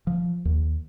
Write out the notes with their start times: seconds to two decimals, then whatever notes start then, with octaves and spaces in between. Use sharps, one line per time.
0.07 F3
0.45 D#2